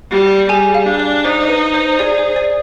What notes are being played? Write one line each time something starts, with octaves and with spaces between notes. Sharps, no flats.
G3
G3 G#4 G#5
F5
D4
D5
D#4 C5
B4
C5
G#4 D5
C5
D5